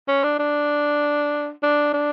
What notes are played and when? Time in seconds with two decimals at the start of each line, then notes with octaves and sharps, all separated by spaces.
0.08 C#4
0.23 D4
0.39 D4
1.63 D4
1.93 D4